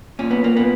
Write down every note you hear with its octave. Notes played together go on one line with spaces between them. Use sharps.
A#2 C#4
B3
A#3
A#2 B3